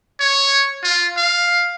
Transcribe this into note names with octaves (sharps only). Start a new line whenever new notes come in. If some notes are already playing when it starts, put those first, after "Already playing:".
C#5
F4
F5